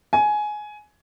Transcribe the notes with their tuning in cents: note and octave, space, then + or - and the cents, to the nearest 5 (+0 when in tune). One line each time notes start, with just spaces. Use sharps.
G#5 +15